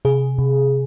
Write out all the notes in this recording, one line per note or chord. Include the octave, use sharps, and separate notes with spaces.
C3 G#4
C3